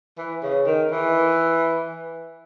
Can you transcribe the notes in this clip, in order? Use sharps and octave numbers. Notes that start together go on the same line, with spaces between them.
E3
C#3
D#3
E3